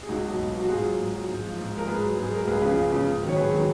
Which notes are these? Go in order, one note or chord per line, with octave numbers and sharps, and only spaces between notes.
G#4
C#2 D#4 F#4
B2 F#3
C#2
B2 F#3
F#4
G#2 F4 G#4
F#3
G#2
F#3
G#2
F3
G#2
F3
A#4
G#2 G#4 B4
F#3
G#2 G#4
F#3 A#4
C#2 G#4 B4
C#3 F3 G#4 B4
C#2
C#3 F3
G#2
D#3 F#3
C#5
G#2 G#4 B4
D#3 F#3